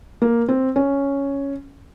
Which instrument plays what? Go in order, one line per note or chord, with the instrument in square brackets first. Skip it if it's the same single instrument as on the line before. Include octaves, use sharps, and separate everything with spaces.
[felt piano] A#3
C4
C#4